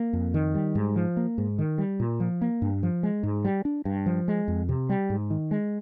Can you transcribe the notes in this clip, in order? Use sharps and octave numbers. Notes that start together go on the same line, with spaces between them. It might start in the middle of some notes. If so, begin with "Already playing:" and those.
Already playing: A#3
F2
D#3
G3
G#2
F3
A#3
G#2
D#3
G3
A#2
F3
A#3
G2
F3
G#3
G#2
G3
D4
G2
F3
G#3
F2
C3
G3
G#2
D#3
G#3